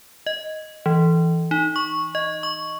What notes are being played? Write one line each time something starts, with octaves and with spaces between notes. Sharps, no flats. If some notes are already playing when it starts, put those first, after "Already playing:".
D#5
E3
D#4
C#6
D#5
C#6